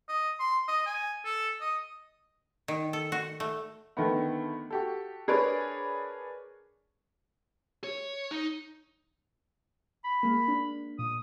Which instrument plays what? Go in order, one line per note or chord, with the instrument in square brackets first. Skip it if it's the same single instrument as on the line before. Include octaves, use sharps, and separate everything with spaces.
[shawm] D#5
C6
D#5
G#5
A4
D#5
[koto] D#3
A4
F#4
A3
[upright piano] D3 D#3 A3 B3
F#4 G4 A4
D4 G#4 A#4 B4 C#5 D5
[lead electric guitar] C#5
D#4
[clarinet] B5
[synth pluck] G#3 A#3
D4
[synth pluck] A#2 [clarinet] D#6